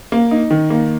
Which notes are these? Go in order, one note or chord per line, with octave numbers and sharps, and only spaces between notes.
A#3
D#4
D#3
A#3